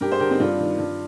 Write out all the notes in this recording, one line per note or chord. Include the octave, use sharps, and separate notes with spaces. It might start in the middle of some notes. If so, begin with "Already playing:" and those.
G2 G4 A#4
G#4 C5
D3 G4 A#4
C4 D#4
G2 D4 F4
D#3
G2